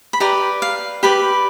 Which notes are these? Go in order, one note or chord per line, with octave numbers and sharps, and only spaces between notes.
B5
G4 B4 D5 A#5
F5
G4 B4 D5 B5